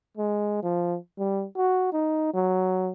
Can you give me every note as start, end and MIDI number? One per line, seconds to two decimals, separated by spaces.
0.18 0.61 56
0.63 0.97 53
1.19 1.45 55
1.57 1.89 66
1.93 2.30 63
2.34 2.92 54